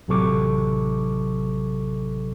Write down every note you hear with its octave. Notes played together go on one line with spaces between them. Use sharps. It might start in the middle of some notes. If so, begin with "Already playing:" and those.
A1 C3 F#3 A4 C#6 D6